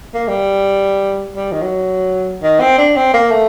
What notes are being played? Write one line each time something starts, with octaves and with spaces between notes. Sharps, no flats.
A#3
G3
G3
D#3
F#3
D#3
C4
D4
C4
A#3
A3